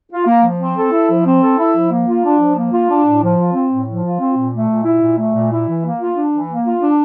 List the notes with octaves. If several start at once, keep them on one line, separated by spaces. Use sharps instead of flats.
F4
A#3
F3
C4
A4
E4
F3
C4
A4
E4
F3
A#3
F4
D4
F3
A#3
F4
D4
A2
F3
F4
C4
A2
F3
F4
C4
A#2
A3
A#2
E4
A#2
A3
A#2
E4
E3
A#3
F4
D4
E3
A#3
F4
D4